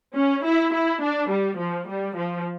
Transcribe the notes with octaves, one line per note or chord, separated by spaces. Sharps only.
C#4
E4
E4
D4
G3
F3
G3
F3